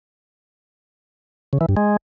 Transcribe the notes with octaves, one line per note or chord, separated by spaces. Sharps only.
C#3
E3
G2
G#3